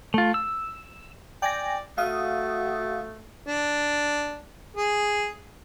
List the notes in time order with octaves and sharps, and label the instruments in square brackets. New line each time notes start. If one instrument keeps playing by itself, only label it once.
[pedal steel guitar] A3 F4
E6
[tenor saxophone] D5 [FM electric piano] G5 G#5 A#6
[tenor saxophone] A3 [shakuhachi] F#4 [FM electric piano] F5 D#6
[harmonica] D4
G#4